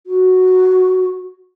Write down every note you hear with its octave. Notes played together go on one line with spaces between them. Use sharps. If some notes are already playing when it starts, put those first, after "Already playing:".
F#4